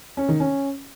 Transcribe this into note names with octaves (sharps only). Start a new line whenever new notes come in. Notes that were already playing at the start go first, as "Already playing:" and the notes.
C#4
D#3
C#4